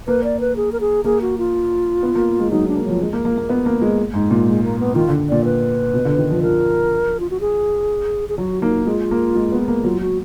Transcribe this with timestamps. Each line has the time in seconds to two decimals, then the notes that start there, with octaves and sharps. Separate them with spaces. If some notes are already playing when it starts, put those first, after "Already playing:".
0.07 A#3 B4
0.24 D5
0.40 B4
0.56 G#4
0.72 A#4
0.80 G#4
1.04 A#3 G#4
1.21 F#4
1.38 F4
2.03 B3
2.15 A#3
2.39 G#3
2.51 F#3 D#4
2.68 D4
2.76 A#3
2.84 F3 F#3
3.01 G#3
3.13 A#3
3.25 A#3
3.38 A#3
3.49 B3
3.66 A#3
3.82 G#3
4.14 G#2
4.31 A#2
4.47 G#3
4.63 A#3
4.79 B3
4.95 D#3 F4
5.08 D3
5.29 A#2 D5
5.44 B4
5.94 B2
6.05 D3
6.18 D#3
6.30 F3
6.42 F3 A#4
7.20 F4
7.30 F#4
7.40 G#4
8.29 G#4
8.38 F#3 F#4
8.62 A#3 D#4
8.86 G#3 F4
9.11 A#3
9.35 G#3
9.52 B3
9.68 A#3
9.84 F#3 F4
10.01 F#4